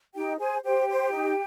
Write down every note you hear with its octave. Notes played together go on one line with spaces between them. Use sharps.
D#4 G4 G5
G#4 C5 G#5
G4 C5 G5
C5
D#4